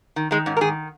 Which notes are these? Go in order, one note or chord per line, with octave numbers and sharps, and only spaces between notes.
D#3
D#3 G#3
G#2 C#4
A#4
D#3 G#4